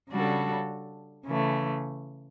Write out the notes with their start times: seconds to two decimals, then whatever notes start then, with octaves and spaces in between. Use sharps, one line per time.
0.11 C#3 G3 D4 F#4 A4
1.26 C#3 E3 A3